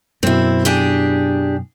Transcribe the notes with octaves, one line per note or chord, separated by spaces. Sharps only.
F#2 B2 C4 E4
D4 G4 G#4